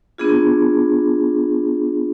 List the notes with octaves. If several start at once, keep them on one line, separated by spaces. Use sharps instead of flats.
B3 D4 F4 G#4